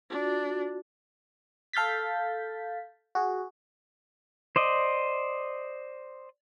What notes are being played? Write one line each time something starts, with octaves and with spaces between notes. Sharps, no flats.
D4 F4 F#4
A4 F5 G6 A6 B6
F#4 G#4
C5 D5 D#5